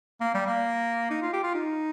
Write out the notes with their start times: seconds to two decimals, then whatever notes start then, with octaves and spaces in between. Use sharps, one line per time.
0.21 A#3
0.34 G3
0.47 A#3
1.10 D#4
1.22 F4
1.33 G4
1.43 F4
1.55 D#4